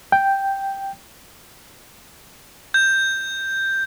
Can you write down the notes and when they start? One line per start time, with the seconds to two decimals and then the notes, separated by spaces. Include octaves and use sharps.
0.12 G5
2.74 G6